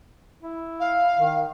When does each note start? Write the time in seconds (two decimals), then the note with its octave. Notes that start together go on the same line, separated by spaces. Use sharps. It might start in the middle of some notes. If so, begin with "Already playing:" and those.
0.42 E4
0.80 F5
1.18 D#3